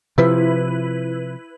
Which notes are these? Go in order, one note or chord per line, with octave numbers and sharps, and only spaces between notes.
C3 F3 E4 B4